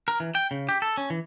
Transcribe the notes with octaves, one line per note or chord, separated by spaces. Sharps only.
A#4
E3
G5
C#3
G4
A4
C#4
E3